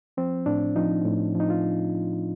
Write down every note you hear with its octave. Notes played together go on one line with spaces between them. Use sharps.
F3 C4
A2 D4
F3 D#4
A2
F3
D#4
F4